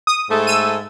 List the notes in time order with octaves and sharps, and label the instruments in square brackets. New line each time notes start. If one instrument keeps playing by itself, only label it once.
[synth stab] D#6
[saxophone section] G#2 A3 A4
[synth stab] E6 D#7